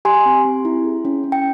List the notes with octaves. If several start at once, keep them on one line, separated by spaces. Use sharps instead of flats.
G4 G#5 C6
C4
C4
E4
G#4
C#4
C#4
G5